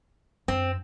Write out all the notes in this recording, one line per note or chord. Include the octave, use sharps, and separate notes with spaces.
F#2 C4